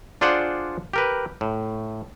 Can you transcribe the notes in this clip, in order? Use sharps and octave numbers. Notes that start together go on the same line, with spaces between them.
D4 F4 G#4 C5 D5 F#5
G4 A#4 B4
A2